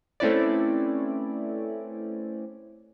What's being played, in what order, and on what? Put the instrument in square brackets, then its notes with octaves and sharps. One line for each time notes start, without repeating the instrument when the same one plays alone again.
[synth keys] A3 C4 C#4 E4 B4 D5